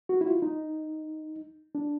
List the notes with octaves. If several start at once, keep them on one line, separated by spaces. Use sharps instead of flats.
F#4
E4
F4
D#4
D4